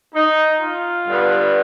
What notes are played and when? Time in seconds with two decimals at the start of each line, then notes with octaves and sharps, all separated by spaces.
0.15 D#4
0.61 F4
1.06 G2 D3 G3 B3